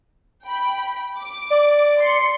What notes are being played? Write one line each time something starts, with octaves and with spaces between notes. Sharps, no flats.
G5 B5
D6
D5
C6 C#7